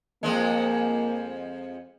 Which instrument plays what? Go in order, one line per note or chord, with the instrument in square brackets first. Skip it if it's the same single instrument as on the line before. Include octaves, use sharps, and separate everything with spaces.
[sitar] F2 F3 G#3 [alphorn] A#3